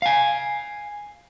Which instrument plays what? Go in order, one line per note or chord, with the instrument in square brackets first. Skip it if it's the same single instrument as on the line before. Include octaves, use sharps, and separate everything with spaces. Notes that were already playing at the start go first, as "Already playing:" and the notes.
[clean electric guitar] F5 G#5